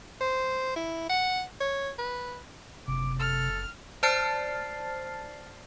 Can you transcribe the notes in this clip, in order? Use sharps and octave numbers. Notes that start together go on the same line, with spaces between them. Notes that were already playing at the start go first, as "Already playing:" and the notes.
C5
E4
F#5
C#5
B4
F#1 C3 D6
A4 F6
C5 D5 A5 F6 A6 C7